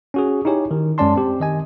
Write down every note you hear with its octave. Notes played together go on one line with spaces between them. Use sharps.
C#4 F#4 G#4
D#4 E4 G4 C#5 G#5
D#3
F#2 G#3 C#4 D5 A5 C6
C4 G4
D#3 D#5 G#5